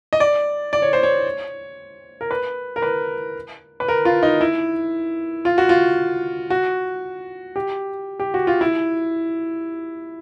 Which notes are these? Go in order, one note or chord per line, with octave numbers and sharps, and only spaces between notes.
D#5
D5
D5
C#5
C5
C#5
A#4
B4
A#4
B4
B4
A#4
F4
D#4
E4
F4
F#4
F4
F#4
G4
G4
F#4
F4
E4